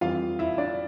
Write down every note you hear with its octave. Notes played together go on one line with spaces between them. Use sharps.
F2 E3 G3 F4 F5
E4 E5
D4 D5